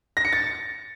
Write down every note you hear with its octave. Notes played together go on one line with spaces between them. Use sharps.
A#6
C#7
A6